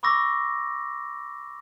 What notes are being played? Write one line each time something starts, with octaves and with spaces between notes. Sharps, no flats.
B5 C#6 D6 E6 A#6